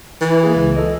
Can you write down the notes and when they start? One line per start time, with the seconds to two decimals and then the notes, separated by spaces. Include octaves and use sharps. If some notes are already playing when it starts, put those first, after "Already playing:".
0.21 E3
0.43 A#3 G#4
0.56 C#2
0.76 F4 A4 D#5